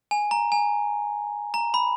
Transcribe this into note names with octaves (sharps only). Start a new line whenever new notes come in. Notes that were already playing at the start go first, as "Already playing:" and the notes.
G#5
A#5
G#5
A#5
B5